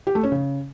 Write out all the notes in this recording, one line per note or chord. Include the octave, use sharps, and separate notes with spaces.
G4
A3
C#4
C#3